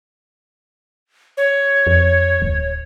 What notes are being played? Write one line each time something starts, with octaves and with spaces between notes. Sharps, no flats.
C#5
F2
D1